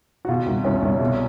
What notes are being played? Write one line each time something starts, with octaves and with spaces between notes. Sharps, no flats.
F#4
B2 F4
C2
C2 C#4
C2
B2